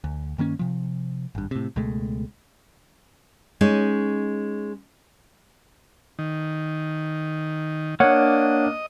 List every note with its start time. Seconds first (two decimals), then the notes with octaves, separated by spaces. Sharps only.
0.04 D2
0.38 G2 D#3 A#3 C#4
0.59 C3 F3
1.35 G#1 G2
1.51 A2 C3
1.76 C#2 B2 G#3 A3
3.61 G#3 C#4 D#4
6.19 D#3
8.00 A#3 D4 C#5 D#5 F#5